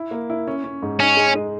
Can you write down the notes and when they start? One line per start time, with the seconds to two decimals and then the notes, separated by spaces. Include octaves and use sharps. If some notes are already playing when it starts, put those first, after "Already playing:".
Already playing: E4
0.11 A#3
0.30 E4
0.47 C#4
0.64 C#4
0.83 G#2
1.00 C#4 D#4
1.17 G#3
1.35 G#3